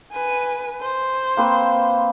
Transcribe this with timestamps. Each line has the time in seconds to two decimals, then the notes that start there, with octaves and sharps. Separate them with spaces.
0.12 B4 G#5
0.81 C5
1.37 A#3 C4 B4